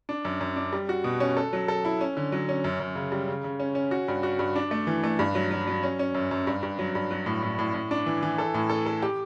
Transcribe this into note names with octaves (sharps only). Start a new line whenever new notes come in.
D4
F#2
F#2
D4
G3
F#4
B2
C#4
A4
F#3
A4
E4
C#4
D3
F#3
C#4
F#2
F#2
C#3
G3
C#3
C#3
C#4
C#4
F#4
G2
F#4
G2
D4
A3
E3
A3
G2
F#3
F#3
F#3
C#4
C#4
F#2
F#2
G2
G2
F#3
G2
F#3
A2
A2
A2
A2
D4
E3
E3
A4
A2
A4
A4
G4